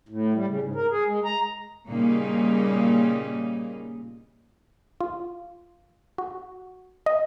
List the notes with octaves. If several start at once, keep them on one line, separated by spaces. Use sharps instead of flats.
A2
G3
C#3
G#2
A#4
G#4
G#3
A#5
A#2 C#3 G3 A#3 D#4
F4
F#4
D#5